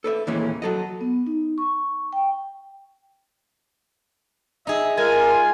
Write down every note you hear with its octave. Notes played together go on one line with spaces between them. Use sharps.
A4 B4 D5 E5
D#2 A#2 E3 G#3 C#4
F#3 A4 D#5
B3
D#4
C#6
G5
D#4 G#4 E5
G#3 F4 A#4 G#5